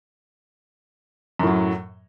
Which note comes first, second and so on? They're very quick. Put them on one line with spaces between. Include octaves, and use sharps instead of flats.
F#2 A2 F#3